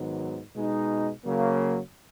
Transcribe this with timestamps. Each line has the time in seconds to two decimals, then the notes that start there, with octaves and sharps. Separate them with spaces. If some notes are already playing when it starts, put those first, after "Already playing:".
Already playing: G#2 D#3 F#3 B3
0.54 B2 G#3 D#4
1.23 C#3 F#3 A#3